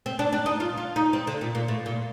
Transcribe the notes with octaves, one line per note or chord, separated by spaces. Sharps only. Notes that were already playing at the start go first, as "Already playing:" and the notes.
C4
D4
D4
D#4
F4
F4
D#4
C4
D3
A#2
A#2
A2
A#2